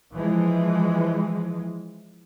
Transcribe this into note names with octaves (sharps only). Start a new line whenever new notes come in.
E3 F3 G#3